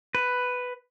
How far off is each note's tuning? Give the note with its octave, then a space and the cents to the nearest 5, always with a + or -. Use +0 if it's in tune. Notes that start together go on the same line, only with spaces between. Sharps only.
B4 +5